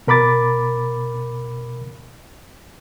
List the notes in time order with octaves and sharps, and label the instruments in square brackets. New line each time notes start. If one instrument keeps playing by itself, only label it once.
[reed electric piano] B2 A#4 B5 D6 A6